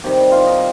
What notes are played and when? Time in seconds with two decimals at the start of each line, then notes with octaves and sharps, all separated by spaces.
0.04 C3 D#3 G3 G4
0.31 F4
0.47 D#4